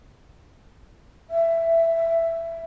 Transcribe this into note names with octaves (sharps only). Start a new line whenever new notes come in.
E5